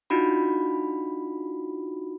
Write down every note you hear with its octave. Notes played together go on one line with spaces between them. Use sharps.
D4 D#4 F4 F#4 B5